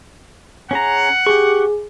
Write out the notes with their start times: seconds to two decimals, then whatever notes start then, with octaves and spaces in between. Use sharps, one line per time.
0.71 C#4 G#4 F#5 A#5
1.27 G4 G#4 C#6